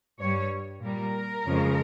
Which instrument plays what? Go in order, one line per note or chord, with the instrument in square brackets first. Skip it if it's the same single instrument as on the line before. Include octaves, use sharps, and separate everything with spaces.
[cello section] G2 G3 C#5
A#2 G3 A#4
F2 C#3 F3 G#3